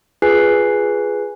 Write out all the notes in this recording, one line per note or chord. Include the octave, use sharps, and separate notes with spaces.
F4 G#4 B4 G#5 F#6 C7